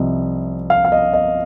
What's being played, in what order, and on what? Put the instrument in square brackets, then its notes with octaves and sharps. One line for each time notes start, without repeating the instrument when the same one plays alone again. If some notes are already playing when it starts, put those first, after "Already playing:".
Already playing: [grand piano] C2 C3 F3 D#5
F5
F5
D#5
D#5